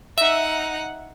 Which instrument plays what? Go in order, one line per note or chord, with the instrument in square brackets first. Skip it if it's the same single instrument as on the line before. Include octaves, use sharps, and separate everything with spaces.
[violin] D#4 F#5 [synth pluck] E5